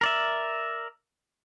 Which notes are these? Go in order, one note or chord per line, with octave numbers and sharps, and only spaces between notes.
A#4 D5 E5